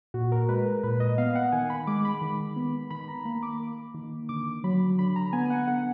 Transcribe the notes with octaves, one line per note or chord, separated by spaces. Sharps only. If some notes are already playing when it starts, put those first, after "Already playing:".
A#2 F#4
A#4
G#3 B4
A#4
A#2 B4
D#5
B3 F5
F#5
D#3 G#5
B5
G#3 D6
B5
D#3
B3
D#3 B5
A#5
A#3 B5
D6
A#3
D#3
D3 D6
F#3 B5
D3 B5
A#5
B3 G#5
G#5
F#5
D3 F#5